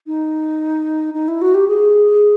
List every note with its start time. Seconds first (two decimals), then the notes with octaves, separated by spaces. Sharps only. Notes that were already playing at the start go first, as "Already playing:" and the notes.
0.07 D#4
1.14 D#4
1.28 E4
1.42 F#4
1.54 G4
1.68 G#4